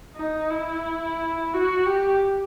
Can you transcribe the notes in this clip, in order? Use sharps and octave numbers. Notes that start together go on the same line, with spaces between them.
D#4
E4
F#4
G4